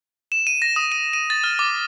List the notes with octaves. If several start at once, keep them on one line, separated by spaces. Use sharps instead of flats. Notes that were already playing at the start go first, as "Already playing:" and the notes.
E7
D#7
A#6
D#6
D#7
D#7
A6
F6
D6